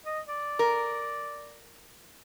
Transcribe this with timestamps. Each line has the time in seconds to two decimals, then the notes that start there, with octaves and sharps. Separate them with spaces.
0.06 D#5
0.28 D5
0.59 A#4